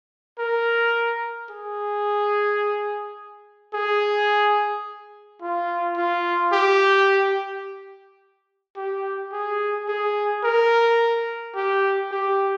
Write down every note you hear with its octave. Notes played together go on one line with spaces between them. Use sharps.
A#4
G#4
G#4
F4
F4
G4
G4
G#4
G#4
A#4
G4
G4